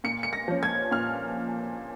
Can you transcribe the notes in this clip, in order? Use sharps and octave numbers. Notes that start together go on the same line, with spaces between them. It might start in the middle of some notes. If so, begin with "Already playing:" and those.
A#2 C#7
C#7
A#6
F3 C#4
G#6
A#2 F6